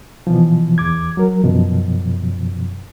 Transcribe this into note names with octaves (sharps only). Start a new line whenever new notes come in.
B2 E3 F3
E2 D6 G#6
F#3 A#4
F#2 B2 F3